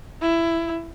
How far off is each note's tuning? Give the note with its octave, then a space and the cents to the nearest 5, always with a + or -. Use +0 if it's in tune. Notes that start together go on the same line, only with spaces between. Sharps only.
E4 +15